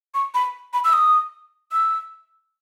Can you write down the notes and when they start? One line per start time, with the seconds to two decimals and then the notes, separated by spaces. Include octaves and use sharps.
0.14 C#6
0.34 B5
0.73 B5
0.84 E6
0.93 D#6
1.72 E6